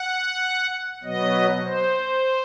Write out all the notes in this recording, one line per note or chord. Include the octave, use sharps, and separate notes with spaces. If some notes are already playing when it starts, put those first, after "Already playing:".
Already playing: F#5
B2 F#3 B3 D#5
C5